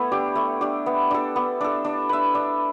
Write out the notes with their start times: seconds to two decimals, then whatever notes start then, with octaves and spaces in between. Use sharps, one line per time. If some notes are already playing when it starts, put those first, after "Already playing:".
Already playing: A3 B3 E4
0.12 D4 G4
0.36 A3
0.61 D4 G4
0.86 B3
1.11 D4 A4
1.36 B3
1.61 D4 A4
1.85 D4
2.09 B4 E5
2.35 D4